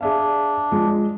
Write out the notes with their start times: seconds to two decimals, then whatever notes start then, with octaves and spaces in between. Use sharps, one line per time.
0.01 D4 G#4 E5 F5
0.72 F3 G#3